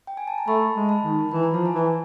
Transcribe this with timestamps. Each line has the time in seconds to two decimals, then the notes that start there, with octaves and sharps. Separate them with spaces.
0.07 G5
0.17 G#5
0.27 A5
0.38 A#5
0.47 A3 A5 B5
0.76 G#3
0.89 A5 B5
1.04 D#3
1.32 E3 B5
1.43 A#5
1.53 F3 A5
1.65 G#5 A#5
1.74 E3